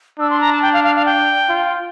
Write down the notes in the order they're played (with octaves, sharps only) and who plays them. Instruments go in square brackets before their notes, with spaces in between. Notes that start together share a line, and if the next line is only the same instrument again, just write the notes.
[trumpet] D4 [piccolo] E6
[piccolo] C6
A#5
A5
G5
F5
F5
F5
G5
[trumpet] F4